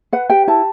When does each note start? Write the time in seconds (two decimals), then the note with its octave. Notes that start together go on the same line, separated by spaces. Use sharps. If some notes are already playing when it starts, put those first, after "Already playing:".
0.13 B4 F#5
0.30 G4 G5
0.48 E4 A5